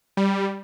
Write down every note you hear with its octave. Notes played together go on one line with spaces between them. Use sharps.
G3